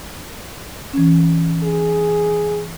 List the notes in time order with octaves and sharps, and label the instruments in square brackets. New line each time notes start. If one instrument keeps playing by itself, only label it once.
[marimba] E3 C#4
[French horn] G#4